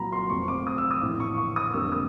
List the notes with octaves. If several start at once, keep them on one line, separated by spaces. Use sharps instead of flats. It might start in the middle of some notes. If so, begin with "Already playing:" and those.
Already playing: C2 A#2 F#3 A#5 B5
C6
F1 F2 C3 C#6
D6
D#6
E6
D#6
A#1 A2 E3 A3 D6
C#6
C#6
D#6
F1 F2 D3 G3 A#3 E6
D#6